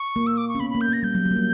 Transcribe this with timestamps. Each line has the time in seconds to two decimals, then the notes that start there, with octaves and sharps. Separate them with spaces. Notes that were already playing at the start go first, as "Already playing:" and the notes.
Already playing: C#6
0.16 A#3
0.27 E6
0.37 D6
0.49 C#6
0.55 C#4
0.60 B3 B5
0.70 A#3 B5
0.81 G6
0.88 A#3 A#6
1.03 G3 G6
1.15 F#3
1.25 F#3
1.31 A#3
1.36 G3